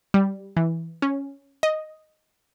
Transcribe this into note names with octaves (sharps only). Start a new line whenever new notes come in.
G3
E3
C#4
D#5